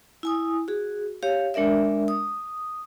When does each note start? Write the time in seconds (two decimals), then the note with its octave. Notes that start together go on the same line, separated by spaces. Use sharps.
0.23 E4 G#5 D#6
0.68 F#4 G#4
1.23 G4 C#5 F5
1.54 G#3 D4 A#4 D5 E5
2.08 D#6